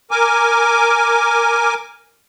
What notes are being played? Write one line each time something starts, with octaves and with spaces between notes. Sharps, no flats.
A#4 G#5 D6